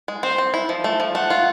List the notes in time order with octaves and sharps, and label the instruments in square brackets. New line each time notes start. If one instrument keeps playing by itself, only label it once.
[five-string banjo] G#3
[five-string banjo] C4 [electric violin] C5
[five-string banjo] C4
E4
F3
A3
F3
[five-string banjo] A3 [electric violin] F#5
[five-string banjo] F4